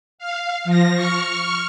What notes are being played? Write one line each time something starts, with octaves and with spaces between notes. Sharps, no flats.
F5
F3 A#6
C#6 F6